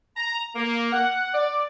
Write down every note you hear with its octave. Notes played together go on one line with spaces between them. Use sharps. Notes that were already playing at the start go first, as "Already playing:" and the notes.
A#5
A#3
F#5
D5